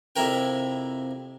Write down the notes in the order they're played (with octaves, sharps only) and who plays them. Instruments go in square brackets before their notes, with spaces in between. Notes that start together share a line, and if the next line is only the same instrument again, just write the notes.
[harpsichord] F2 C3 E4 A#4 G5